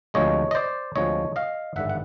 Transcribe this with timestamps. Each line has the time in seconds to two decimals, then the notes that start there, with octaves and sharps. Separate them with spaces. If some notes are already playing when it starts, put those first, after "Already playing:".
0.14 D2 C3 F3 G#3 C#5 D#5
0.51 D#5
0.55 C5 D5
0.96 D2 C3 F3 G#3 C#5 D#5
1.36 D#5 F5
1.76 G#1 G2 D3 G3 E5 F#5
1.89 F#5